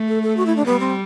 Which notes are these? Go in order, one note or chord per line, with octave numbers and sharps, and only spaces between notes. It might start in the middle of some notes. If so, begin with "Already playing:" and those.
Already playing: A3
A4
A4
F#4
E4
D4
G3 B3
C4